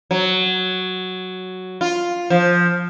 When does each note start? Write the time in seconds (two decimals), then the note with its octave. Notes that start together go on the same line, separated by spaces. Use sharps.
0.11 F#3
1.81 F4
2.30 F3